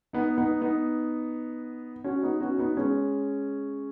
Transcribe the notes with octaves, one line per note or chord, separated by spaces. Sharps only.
B3 D#4
B3 D#4
B3 D#4
C#4 F#4
B3 D#4
C#4 F#4
B3 D#4
G#3 C#4